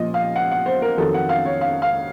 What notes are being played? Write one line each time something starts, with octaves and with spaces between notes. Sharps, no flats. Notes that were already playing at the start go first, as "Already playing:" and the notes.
Already playing: A#2 F3 D#5
F5
F#5
F#5
C5
A#4
F2 D#3 F#3 A4
F#5
F5
C#5
F5
F5